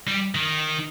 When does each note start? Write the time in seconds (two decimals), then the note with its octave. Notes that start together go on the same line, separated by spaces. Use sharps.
0.07 G3
0.35 D#3